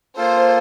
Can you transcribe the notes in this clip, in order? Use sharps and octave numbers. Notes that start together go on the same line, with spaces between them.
A#3 F4 A4 C5